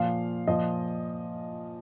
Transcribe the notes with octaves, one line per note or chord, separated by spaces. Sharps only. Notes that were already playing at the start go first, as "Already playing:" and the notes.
Already playing: A#2 F3 F5
A#2 F3 D#5